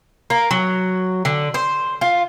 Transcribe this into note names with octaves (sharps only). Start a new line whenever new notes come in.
A#3
F#3
D3
C5
F4